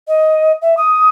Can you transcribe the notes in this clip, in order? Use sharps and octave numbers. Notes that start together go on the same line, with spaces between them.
D#5
E5
D#6